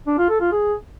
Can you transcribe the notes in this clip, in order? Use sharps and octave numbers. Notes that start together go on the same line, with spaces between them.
D4
F4
A4
F4
G#4